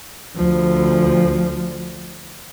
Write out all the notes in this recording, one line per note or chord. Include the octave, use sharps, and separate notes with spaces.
D2 F3